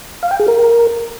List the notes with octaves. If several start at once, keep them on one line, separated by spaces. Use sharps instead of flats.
F5
G5
G#4
A#4